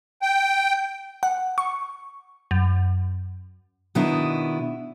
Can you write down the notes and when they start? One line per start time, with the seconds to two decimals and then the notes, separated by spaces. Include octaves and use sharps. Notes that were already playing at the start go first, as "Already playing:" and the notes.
0.22 G5
1.23 F#5
1.58 C#6
2.51 F#2
3.95 B2 D#3 B3 D4 E4